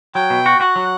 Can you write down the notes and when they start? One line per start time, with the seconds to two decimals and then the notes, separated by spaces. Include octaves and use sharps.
0.15 F#3 G5
0.30 B2
0.46 F#4
0.60 F#4 F#5
0.76 F#3